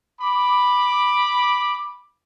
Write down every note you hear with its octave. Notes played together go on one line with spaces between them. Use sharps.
B5 D6